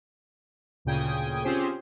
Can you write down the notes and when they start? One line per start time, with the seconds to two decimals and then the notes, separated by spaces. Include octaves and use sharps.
0.85 D2 A#2 C#3 G5 D#6 G#6
1.44 C4 C#4 F4 G4 G#4 C5